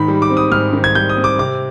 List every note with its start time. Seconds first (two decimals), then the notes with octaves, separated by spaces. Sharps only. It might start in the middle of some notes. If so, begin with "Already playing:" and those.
Already playing: G#2 D#3 B5
0.08 G3
0.22 D6
0.30 C4
0.37 D#6
0.51 G#2 F6
0.73 D#3
0.84 G#6
0.95 G3 G6
1.09 D#6
1.17 C4
1.24 D6
1.39 C3 D6